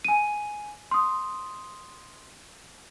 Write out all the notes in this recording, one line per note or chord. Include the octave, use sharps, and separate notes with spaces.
G#5 D#7
C6 D#6